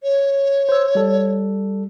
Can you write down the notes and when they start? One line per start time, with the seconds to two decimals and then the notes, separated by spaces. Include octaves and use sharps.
0.03 C#5
0.69 C5 E6
0.95 G3 A4